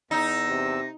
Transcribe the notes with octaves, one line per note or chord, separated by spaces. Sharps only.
E2 D#4 E6 A#6
C3